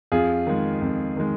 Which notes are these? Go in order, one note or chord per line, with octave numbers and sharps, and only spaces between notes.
F2 F4 G#4
D#3 G#3
F2
D#3 G#3